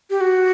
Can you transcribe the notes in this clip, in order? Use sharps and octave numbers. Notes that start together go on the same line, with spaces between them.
G4
F#4